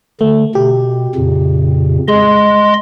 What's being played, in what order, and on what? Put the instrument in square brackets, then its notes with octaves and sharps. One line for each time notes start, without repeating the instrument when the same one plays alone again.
[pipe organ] D3 [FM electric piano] A3
[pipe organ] B2 [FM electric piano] G4
[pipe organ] F2 A#2 C#3
[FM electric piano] G#3 [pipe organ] D#5 C6